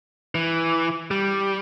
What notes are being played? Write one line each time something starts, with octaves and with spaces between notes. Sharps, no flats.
E3
G3